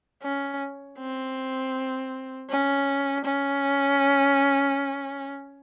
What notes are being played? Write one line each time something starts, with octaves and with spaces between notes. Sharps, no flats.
C#4
C4
C#4
C#4